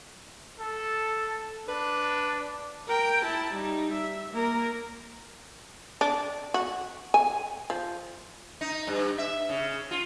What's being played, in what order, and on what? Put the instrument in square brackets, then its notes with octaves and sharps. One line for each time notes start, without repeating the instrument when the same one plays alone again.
[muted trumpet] A4
[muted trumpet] D4 [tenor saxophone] B4
[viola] A#4 G5
E4 A5
G3 D#4
E5
A#3 A#4
[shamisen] D4
F#4
G#5
F3
[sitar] D#4
G2
E5
C#3
F4